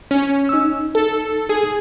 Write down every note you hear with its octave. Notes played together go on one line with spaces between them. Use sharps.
C#4
D#4 E6
A4
G#4